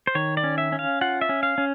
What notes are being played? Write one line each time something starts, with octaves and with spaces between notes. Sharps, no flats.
C5
D#3 C#5
D5
C#4
E5
C#4
F5
F4 F#5
E5
C#4
F5
C#4